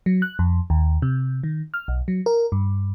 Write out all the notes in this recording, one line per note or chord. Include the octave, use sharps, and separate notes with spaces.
F#3
F#6
F2
D#2
C3
D#3
F6
B1
F#3
A#4
G2